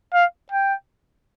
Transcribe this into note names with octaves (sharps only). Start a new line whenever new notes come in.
F5
G5